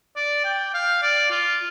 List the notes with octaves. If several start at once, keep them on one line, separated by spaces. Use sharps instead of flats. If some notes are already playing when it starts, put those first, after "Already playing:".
D5
G5
F5
D5
F4